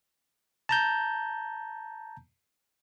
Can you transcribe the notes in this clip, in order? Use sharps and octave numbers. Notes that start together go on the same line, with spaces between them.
A5 A#5 G6